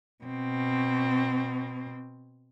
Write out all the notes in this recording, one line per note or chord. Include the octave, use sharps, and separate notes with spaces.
B2 C4